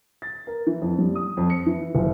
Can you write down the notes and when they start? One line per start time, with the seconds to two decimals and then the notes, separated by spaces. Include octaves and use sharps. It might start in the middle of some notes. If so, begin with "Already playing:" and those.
0.22 A6
0.47 A#4
0.67 E3
0.82 F2
0.99 G3
1.15 D#6
1.37 F2
1.50 C#7
1.66 E3
1.95 F#1